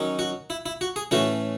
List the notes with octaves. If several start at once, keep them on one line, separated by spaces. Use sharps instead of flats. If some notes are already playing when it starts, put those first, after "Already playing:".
Already playing: D#3 F#3 C#4
F#4
E4
E4
F#4
G#4
A2 E3 A3 C#4 F#4